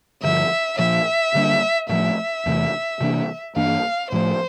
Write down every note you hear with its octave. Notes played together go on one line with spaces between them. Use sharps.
G2 D3 F3 E5
A#2 F3 A#3 E5
D3 G3 A#3 D4
A2 F3 A3 E5
E2 C3 E3 A3
C3 E3 A#3 D4
G2 E3 A#3 D4 F5
A2 F3 A3 C5